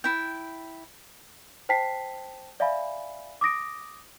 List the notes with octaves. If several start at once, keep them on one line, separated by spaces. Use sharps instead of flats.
E4 G5
C5 G5 A5 B6 C7
D5 E5 F5 G#5 B5
D6 D#6 A#6 D7